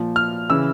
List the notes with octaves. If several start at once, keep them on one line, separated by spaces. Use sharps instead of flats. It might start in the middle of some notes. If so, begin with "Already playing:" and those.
Already playing: A#2 F3
F6
C#3 E3 E6